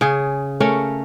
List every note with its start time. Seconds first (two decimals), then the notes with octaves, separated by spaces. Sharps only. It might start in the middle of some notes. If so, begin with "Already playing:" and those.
0.01 C#3 G#4
0.60 A3 C#4 A#4